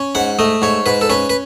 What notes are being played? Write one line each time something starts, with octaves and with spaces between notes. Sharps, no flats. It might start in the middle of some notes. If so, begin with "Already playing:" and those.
Already playing: C#4
G#2 F#5
A3 D#5
G#2 C#5
G#2 B4
A4
C#4 B4
B4